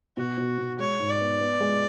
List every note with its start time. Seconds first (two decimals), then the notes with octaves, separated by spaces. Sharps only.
0.17 B2 F#4
0.37 B2
0.58 B2
0.79 G#3 C#5
0.99 G#2
1.10 D5
1.20 B3
1.40 B3
1.61 G#3